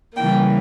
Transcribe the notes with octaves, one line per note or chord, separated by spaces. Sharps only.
C#3 E3 G3 A#3 G5